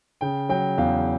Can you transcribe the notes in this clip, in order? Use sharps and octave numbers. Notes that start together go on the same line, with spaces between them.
C#3 G5
F#3 G5
E2 F5